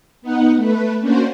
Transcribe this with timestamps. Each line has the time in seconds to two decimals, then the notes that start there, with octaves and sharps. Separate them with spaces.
0.22 B3 D#4 F#5
0.56 A3 B4
1.00 A#3 C#4 D4 F#4 C5